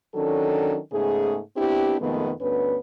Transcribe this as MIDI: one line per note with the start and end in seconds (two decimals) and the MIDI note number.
0.14 0.77 51
0.14 0.77 54
0.14 0.77 61
0.14 0.77 62
0.14 0.77 69
0.92 1.38 44
0.92 1.38 49
0.92 1.38 57
0.92 1.38 59
0.92 1.38 68
1.56 1.95 59
1.56 1.95 60
1.56 1.95 62
1.56 1.95 64
1.56 1.95 67
2.00 2.32 41
2.00 2.32 47
2.00 2.32 51
2.00 2.32 56
2.00 2.32 57
2.00 2.32 59
2.40 2.76 38
2.40 2.76 43
2.40 2.76 59
2.40 2.76 61
2.40 2.76 71